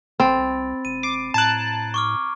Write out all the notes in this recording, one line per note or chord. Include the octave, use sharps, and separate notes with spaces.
A1 C4 B5 A6
C2
E1 D#7
D6 C7
A2 A5 A#5 F#6 G#6 D7
C#6 D6 F6